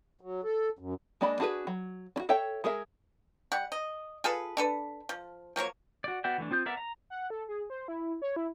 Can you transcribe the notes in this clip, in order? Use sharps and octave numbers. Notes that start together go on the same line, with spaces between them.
F#3
A4
F#2
G#3 A#3 D4 D#5 B5
D4 F#4 G#4 A4 B4
F#3
D4 F#4
A4 C#5 E5 G5
G#3 G#4 A#4 E5
G3 F#5
D#5
F4 G#4 A4 B4
D4 A4 B4
F3
F3 F#3 A#3 C#5
F#4 D5
B3 F#4 D5 E5 G5
E3 A3 D4
C4 F4 D#6 G6
B3 A#4 D5 E5
A#5
F#5
A4
G#4
C5
E4
C#5
E4